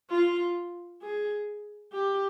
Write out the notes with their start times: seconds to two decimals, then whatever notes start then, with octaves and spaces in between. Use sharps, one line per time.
0.10 F4
1.02 G#4
1.92 G4